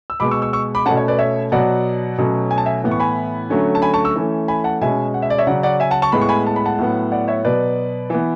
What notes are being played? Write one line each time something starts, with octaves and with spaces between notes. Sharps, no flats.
E6
B2 G#3 B3 B5 D6
C#6 E6
C#6 E6
C#6 E6
B5 D6
B2 A3 C#4 F#5 A5
C#5
B4 D5
C#5 E5
B2 F#3 B3 D5 F#5
B2 F#3 A3 C#4
G#5
A5
E5 G#5
A2 E3 B3
C#6
G#5 B5
D3 F#3 A3 C#4
A5
G#5 B5
A5 C#6
C#6 E6
E3 A3 C#4
G#5 B5
F#5 A5
B2 G#3 C#4 E5 G#5
F#5
E5
D5
C#5 E5
C#3 F#3 C#4 D5 F#5
D5 F#5
E5 G#5
F#5 A5
A5 C#6
A2 G#3 B3 B5
C#6
G#5 B5
A5
B5
F#5 A5
A2 F#3 B3
D5 F#5
C#5 E5
B2 F#3 B3 B4 D5
E3 B3